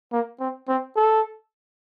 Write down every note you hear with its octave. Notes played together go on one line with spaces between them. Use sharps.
A#3
C4
C4
A4